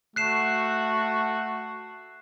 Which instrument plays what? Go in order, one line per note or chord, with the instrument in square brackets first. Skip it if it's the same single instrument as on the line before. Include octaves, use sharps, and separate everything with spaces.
[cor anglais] A3 [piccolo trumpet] F#4 [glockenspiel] F#6 C7 E7